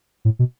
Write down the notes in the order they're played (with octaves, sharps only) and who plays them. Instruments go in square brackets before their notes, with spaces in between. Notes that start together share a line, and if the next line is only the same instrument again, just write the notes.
[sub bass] A2
B2